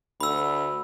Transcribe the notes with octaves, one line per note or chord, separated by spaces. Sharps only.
D2 B5 E6